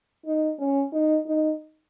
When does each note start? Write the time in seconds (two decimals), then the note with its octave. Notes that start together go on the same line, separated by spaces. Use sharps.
0.26 D#4
0.59 C#4
0.93 D#4
1.27 D#4